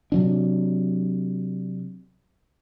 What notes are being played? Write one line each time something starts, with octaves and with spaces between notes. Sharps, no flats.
C3 F#3 D4